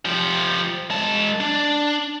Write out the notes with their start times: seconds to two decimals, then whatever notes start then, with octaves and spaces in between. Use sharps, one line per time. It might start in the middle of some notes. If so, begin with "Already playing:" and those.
0.05 F3 G4
0.90 G#3 A5
1.40 D4